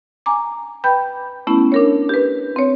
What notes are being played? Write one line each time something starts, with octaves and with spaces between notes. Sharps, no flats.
G#5 A#5 D6
B4 G5 B5 G6
A3 B3 C#4 E4
D4 A#4 C#5
G4 B4
C4 C#5